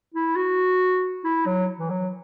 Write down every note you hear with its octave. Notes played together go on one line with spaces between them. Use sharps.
E4
F#4
E4
F#3
E3
F#3